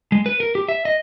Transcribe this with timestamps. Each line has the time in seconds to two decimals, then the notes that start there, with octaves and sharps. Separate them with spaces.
0.12 G#3
0.26 B4
0.40 A#4
0.55 G4
0.69 E5
0.85 D#5